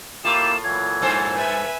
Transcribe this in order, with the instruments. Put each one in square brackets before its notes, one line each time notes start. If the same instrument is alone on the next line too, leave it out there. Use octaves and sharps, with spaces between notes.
[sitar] A2 F4 [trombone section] A#3 E4 G4 [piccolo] E7
[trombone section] A#2 E3 F#3 [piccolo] G#6
[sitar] G2 A4 C5
[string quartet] B4 E5 G#5